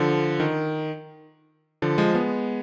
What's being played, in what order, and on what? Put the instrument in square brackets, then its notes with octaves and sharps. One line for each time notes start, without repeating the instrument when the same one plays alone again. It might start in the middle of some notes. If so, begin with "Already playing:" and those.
Already playing: [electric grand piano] D3 F3
D#3
D3 F3
F3 G#3
G#3 B3